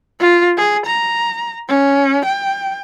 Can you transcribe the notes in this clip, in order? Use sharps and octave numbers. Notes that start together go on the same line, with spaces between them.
F4
G#4
A#5
C#4
G5